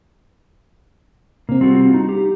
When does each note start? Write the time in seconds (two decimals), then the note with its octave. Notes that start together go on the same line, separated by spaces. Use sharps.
1.49 C3 A#3 C4
1.61 G3 C4 F4 F#4
1.94 D#4
2.09 G4